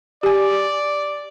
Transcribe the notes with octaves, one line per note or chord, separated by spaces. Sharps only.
G4 D5 G#5